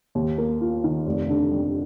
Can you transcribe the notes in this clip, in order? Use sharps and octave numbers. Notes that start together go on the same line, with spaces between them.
D#2
A#3
F4
D#3
F1
D3
G3